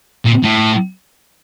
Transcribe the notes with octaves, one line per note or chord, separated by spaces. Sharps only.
A#2
A2